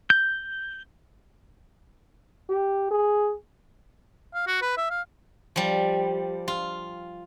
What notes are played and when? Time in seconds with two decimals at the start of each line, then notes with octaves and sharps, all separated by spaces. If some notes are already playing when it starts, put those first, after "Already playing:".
0.10 G6
2.50 G4
2.91 G#4
4.34 F5
4.47 F#4
4.62 B4
4.77 E5
4.90 F5
5.56 F3 G3
6.48 F4